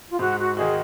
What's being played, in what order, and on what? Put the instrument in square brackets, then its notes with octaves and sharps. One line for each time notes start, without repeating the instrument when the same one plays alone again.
[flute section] F4
[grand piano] G#2 [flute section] F#4
[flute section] F#4
[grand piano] D#3 G#3 D#4 F#4 [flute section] G#4